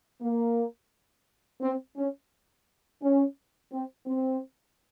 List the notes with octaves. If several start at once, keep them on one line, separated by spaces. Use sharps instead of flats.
A#3
C4
C#4
C#4
C4
C4